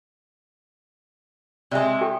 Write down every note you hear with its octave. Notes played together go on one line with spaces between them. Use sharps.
C3 G#3 D5 E5 G#5
G4 A4 G5